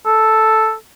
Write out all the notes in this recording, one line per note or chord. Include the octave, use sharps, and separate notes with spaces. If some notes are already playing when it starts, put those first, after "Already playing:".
A4